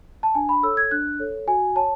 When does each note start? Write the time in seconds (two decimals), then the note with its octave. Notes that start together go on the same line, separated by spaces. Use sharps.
0.23 A5
0.35 D4 G#5
0.49 B5
0.63 A4 C#5 E6
0.77 G#6
0.91 D4 F#6
1.19 A4 C#5
1.47 F#4 G#5
1.76 C#5 A5